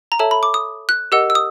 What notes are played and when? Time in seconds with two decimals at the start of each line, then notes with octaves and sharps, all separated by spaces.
0.12 A#5
0.19 A4 C#5 E5 A5
0.31 B5
0.43 D6
0.54 D#6
0.89 F#6
1.12 G4 A#4 D#5 F#5 E6
1.30 E6
1.35 D#6